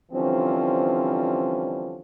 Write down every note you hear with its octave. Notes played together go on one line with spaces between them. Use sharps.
D3 E3 F3 G3 C4 C#4